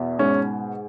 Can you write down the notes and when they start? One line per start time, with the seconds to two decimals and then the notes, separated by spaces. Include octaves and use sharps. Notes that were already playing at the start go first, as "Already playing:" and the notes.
Already playing: E2 B2
0.19 G#2 C#4